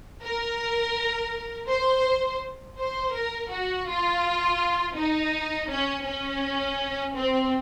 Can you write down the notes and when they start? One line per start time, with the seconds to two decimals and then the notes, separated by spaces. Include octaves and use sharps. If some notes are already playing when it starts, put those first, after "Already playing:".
0.23 A#4
1.68 C5
2.78 C5
3.14 A#4
3.51 F#4
3.88 F4
4.97 D#4
5.69 C#4
6.06 C#4
7.15 C4